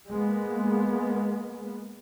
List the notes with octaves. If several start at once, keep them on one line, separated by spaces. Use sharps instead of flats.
G#3 A#3 B3